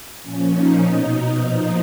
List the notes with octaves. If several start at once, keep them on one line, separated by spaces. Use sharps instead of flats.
A#2 F3 C#4
D#4
B2
A#2 F3